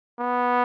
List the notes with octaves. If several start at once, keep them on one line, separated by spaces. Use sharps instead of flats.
B3